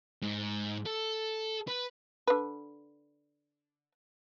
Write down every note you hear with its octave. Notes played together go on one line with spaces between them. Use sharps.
G#2
A4
B4
D3 B4